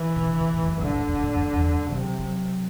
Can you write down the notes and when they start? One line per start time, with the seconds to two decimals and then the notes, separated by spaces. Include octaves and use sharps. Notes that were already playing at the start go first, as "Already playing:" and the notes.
Already playing: E3
0.16 C3
0.26 D3
0.41 C3
0.54 A2
0.63 E2
0.68 F#2
0.82 G2 D3
0.95 A2
1.09 G2
1.15 B2
1.23 A2
1.36 F#2
1.49 F#2
1.55 E2
1.73 G2
1.87 G3
1.91 C3 F#3
2.19 F#3